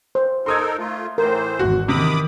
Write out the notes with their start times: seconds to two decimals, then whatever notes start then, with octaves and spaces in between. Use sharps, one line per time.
0.15 C5
0.46 D#4 A4 A#4 C6 D#6 G#6
0.78 A3 F4
1.18 A2 E3 A#4 C5
1.59 G#1 E2 F#4
1.88 C3 D#3 E3 B5 D6 D#6